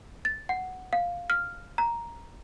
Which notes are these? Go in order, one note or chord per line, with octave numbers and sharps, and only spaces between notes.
A6
F#5
F5
F6
A#5